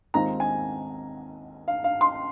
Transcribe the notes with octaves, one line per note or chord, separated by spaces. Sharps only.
D#2 D#3 G#3 C4 F4 A#5
G#5
F5
F5
C6